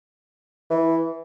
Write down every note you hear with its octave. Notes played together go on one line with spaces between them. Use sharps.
E3